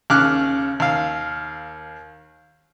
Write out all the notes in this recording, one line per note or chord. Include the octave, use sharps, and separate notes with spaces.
D#2 C#3 D6 F6 F#6
D#2 F5